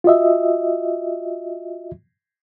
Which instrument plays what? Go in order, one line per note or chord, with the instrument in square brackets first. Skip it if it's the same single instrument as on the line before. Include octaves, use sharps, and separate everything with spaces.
[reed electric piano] F4 F#4 D#5 E5